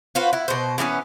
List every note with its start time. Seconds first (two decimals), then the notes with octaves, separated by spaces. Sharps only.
0.15 F4 F#4 B4 C5
0.33 E4
0.48 B2 C5
0.78 E3 A3 B3 C#4